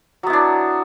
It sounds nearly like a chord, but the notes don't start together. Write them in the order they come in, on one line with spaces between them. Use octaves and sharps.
F#3 B3 E4 D4